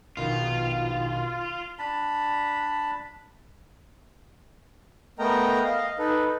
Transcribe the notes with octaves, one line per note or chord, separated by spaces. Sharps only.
A#1 B2 D#3 F4
D4 A5 B5
A3 B3 A#4 D#5 G5 A#5
D#5 F5
D#4 A4 B4